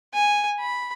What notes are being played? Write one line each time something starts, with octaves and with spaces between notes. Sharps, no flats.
G#5
B5